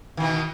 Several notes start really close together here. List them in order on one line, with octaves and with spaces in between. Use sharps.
D#3 B2 E3